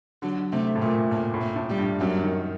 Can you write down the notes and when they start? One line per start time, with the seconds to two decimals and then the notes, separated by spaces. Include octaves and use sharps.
0.22 D3 F#3
0.52 C3 A3
0.75 A2
0.82 A#2 A3
1.11 A2 A#3
1.34 A2
1.41 A#3
1.56 A2
1.70 G3
1.78 G2
2.00 F#2 F#3
2.23 D#3